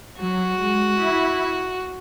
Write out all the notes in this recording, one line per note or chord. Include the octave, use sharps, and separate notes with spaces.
F#3 F#4
G#3
E4